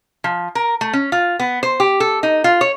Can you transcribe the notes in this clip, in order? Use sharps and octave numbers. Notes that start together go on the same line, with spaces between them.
F3
A#4
A3
C#4
F4
B3
C5
G4
A4
D#4
F4
C#5